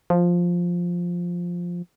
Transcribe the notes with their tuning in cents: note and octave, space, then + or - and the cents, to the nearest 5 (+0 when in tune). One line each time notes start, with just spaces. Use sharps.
F3 +5